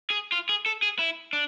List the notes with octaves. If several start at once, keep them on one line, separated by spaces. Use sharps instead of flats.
G#4
F4
G#4
A4
G#4
E4
D4